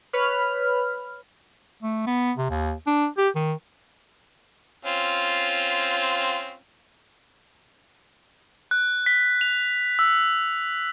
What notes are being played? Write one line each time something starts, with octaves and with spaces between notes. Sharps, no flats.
B4 C#5 B5 F6
A3
B3
C3
D#2
D4
G4
D#3
C4 C#4 F4
F#6
B6
F7
E6